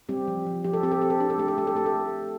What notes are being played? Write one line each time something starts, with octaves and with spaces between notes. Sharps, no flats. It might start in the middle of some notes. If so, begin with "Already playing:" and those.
G3 C4 G4
F3
F3
F3 G4
A4
C4 G4
A4
C4 G4
A4
D4 G4
A4
A3 G4
A4
A3 G4
A4
A3 G4
A4